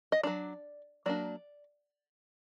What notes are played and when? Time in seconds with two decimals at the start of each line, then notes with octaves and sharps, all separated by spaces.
0.12 D#5
0.23 F#3 A#3 D4 D5
1.06 F#3 A#3 D4 D5